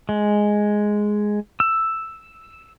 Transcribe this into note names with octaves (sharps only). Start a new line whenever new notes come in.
G#3
E6